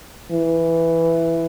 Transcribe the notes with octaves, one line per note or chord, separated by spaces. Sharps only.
E3